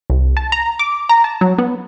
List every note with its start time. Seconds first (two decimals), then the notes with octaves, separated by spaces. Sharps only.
0.10 C2
0.37 A5
0.52 A#5
0.79 D6
1.09 A#5
1.24 A5
1.41 F#3
1.58 B3